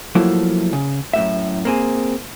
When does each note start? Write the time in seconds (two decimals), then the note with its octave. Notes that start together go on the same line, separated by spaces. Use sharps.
0.15 F3 F#3 A3 A#3 E4
0.73 C#3
1.13 F#2 A2 E5
1.65 A#3 C4 G#4